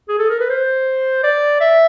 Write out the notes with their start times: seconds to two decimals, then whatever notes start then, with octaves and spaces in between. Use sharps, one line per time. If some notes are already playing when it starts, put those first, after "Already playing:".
0.09 G#4
0.19 A4
0.30 A#4
0.40 B4
0.50 C5
1.24 D5
1.61 E5